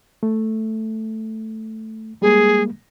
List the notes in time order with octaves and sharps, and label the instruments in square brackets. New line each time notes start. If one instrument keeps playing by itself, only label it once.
[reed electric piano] A3
[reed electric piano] G3 G#3 A#3 [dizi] G#4